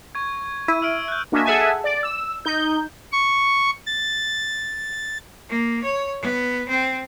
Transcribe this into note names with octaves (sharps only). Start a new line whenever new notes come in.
C#6 G#6
E4 E5 D#7
E6 F6 D7
F#6 G6
A#3 D4 F#4 D#5 E5 G#5
G#4 A4 E5 F#5 G#5 A5
D5
E6
D#4 G6
C#6
A6
A#3
C#5
B3
C4